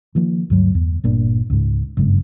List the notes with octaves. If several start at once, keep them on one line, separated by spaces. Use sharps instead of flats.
D#3 F3 A#3
D2 G2 F#3
E2
G1 A#2 D4
C#2 G#2
F#1 G2 C#3 G#3